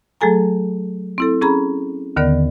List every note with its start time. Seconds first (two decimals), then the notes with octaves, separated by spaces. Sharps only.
0.21 F#3 A3 G#4 A4 G#5 A#5
1.18 C4 E4 A4
1.41 C#4 G#4 A#5 B5
2.16 D#2 D3 D#3 B3 A#4 D5